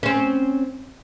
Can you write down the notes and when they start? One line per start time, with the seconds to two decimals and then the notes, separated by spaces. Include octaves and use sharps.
0.03 C4 C#4